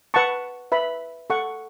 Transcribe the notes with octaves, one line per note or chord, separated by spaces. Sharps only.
B4 F#5 A5 C#6
B4 E5 B5
A4 F#5 C#6